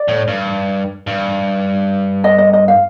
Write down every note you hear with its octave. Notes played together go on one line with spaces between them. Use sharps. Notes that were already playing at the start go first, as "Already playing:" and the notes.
Already playing: D5
A2
G2
G2
D#5
D#5
D#5
F5